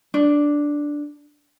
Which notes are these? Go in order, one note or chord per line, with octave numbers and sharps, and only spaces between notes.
D4